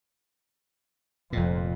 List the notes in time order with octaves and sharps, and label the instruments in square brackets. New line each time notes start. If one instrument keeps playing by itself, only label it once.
[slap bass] F1 A#2 [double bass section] F2